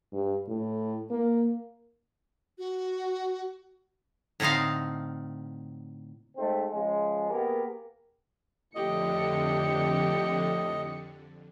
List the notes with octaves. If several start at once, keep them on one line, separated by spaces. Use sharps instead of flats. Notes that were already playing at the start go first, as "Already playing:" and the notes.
G2
A2
A#3
F#4
A2 D3 C4 D#4 F5
G#2 A3 C4
C#3 F3 G#3
A#3 B3 G4 G#4 A#4
F2 A2 D3 G4 D#5 C#7